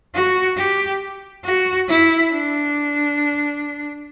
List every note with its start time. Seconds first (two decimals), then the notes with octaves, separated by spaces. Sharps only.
0.14 F#4
0.57 G4
1.44 F#4
1.89 E4
2.31 D4